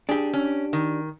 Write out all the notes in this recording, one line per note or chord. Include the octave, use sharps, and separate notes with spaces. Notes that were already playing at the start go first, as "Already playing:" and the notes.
D4 G4 G#4
C#4
D#3